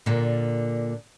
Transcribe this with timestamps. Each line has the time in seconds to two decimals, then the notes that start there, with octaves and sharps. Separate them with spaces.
0.06 A#2 D3